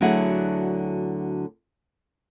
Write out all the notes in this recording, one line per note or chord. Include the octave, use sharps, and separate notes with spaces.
D2 D3 F#3 E4 G#4 F#5